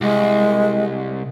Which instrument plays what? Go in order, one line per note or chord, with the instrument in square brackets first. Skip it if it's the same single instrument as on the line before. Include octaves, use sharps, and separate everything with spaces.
[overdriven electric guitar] C2 [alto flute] G#3